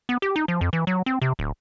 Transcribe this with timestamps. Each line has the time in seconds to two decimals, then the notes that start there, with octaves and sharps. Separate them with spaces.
0.09 B3
0.22 G4
0.36 D#4
0.48 F3
0.61 F2
0.73 E3
0.87 F#3
1.06 C4
1.22 C3
1.39 D1